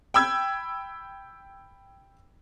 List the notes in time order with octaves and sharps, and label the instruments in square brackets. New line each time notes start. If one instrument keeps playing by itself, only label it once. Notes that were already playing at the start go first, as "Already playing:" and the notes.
[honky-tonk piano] G5 B5 E6 G#6